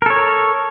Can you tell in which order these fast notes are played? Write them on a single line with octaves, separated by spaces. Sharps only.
A#4 A4 C#5